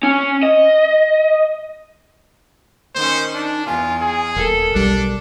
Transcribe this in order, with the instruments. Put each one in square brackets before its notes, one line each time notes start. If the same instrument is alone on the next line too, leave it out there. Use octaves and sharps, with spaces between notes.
[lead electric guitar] C#4
D#5
[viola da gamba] D#3 C#4 [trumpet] C5
[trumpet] D4 [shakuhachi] D#4
[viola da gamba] E2 [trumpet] F4 [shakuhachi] G#5
[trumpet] G#4
[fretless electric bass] D#1 [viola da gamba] A4 [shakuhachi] A#4
[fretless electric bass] B1 G3 [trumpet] D4